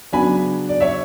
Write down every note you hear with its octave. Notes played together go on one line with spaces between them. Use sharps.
C#3 F#3 B3 D4 G#5 B5
D5
C#5 E5